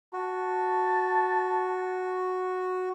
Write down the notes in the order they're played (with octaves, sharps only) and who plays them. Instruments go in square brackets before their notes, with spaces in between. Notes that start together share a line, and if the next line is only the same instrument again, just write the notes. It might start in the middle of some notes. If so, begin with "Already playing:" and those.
[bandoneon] F#4 [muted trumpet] A5